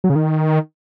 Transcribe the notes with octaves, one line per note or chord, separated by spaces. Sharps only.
F#3
C#3
D#3